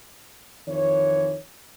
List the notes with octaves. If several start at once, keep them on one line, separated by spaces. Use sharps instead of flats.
F2 D#3 E3 C#5